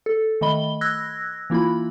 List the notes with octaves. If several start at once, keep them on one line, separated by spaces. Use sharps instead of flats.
A4
D#3 A3 D#5 B5 G7
E6 F#6 G#6 A#6
E3 A#3 E4 F4 B5